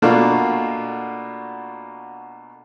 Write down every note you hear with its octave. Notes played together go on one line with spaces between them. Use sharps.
B2 A3 A#3 D4 F4 F#4